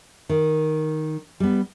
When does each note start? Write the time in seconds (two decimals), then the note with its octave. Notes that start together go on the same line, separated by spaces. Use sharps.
0.29 D#3
1.40 G3 B3